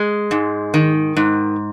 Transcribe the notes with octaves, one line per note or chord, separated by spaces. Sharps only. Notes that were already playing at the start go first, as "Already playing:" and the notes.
Already playing: G#3
G#2
D#3
G#2